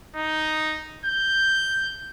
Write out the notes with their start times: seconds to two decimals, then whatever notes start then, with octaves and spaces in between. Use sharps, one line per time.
0.16 D#4
1.05 G6